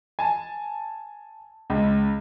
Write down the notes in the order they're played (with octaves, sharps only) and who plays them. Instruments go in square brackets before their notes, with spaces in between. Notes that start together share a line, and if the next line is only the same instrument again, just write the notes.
[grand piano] G#5 A5
C#2